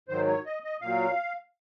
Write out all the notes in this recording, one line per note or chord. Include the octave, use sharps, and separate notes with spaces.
G#2 D#3 F#3 C5
C#5
D#5
D#5
A#2 F#3 F5